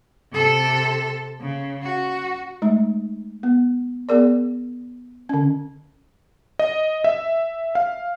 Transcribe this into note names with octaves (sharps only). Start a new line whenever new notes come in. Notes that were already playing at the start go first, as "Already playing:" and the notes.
C3 A4
C#3
F#4
G#3 A3 D#4
B3
B3 G#4 A#4 D5
D3 C#4
D#5
E5
F5